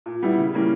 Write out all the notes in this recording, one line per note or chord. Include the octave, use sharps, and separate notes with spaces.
A#2
G3 B3 E4
C#3
E3 G3 A#3 C#4